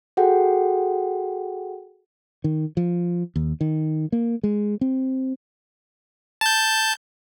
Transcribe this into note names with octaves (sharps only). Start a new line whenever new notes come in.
F#4 G#4 A4 F#5 G5
D#3
F3
D#2
D#3
A#3
G#3
C4
A5 G6